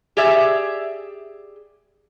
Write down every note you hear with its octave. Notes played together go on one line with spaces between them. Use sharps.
G4 G#4 D5 E5